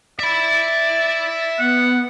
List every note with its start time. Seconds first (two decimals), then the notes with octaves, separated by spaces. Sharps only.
0.19 D5 E5 B5
1.59 B3 F#5